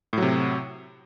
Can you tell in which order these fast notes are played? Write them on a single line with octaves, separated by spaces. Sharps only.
A2 F#3 C3